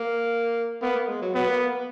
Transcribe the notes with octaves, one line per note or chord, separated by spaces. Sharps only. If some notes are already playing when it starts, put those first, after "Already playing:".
Already playing: A#3
A#3 B3
A#3
G#3
F#3
F#3 B3
A#3
A#3
B3